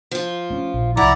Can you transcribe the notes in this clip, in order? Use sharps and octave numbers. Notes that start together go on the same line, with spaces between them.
F3 F4
A3 C#4
A#1
C2 F3 E4 D5 F#5 A#5